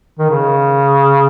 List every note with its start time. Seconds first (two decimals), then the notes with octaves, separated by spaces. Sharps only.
0.19 D#3
0.30 C#3